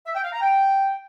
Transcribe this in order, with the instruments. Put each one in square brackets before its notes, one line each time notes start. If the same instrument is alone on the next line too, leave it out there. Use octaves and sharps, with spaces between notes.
[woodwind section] E5
G5
F5
A#5
G5